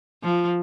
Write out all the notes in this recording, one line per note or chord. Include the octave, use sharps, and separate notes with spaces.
F3